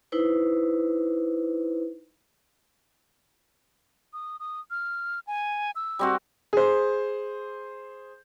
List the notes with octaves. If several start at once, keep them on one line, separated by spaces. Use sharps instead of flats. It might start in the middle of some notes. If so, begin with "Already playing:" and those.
D#4 E4 B4 C5
D#6
D#6
F6
G#5
E6
G3 C4 F#4
G#4 C5